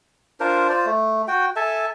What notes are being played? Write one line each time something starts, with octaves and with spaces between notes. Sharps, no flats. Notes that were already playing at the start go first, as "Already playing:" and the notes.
D4 F4 A#4 C5
F4 C5 D5
A3
F#4 G5
A4 E5 G#5 A5